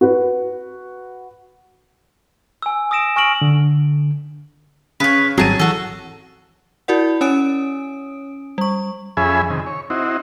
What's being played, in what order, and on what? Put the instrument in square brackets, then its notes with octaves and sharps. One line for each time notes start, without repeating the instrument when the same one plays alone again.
[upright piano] F#4 B4
[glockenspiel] G#5 E6
D#6 E6 A#6 D7 E7
G#5 C#6 F6 A#6 D7 F#7
[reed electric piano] D3
[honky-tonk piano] C#3 [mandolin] B4 C#5
[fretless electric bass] G#1 G3 C4 [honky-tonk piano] F#3 D#7 [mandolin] G#4 A5
[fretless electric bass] E3 [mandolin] F#4 A4
[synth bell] E4 F#4 A#4 D5 F#5
C#4 C#5 G#5 D#6 D7
G3 C#6
[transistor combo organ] F2 C#4 G#4 E5 G#5 B5
C3 D#3
C#5
C4 D#4 E4 F#4